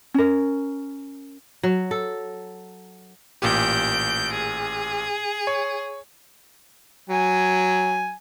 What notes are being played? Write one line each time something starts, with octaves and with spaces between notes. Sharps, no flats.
C#4 A#4
F#3
A4
A1 A#2 G4 G6 D7
G#4
C#5
F#3 G#5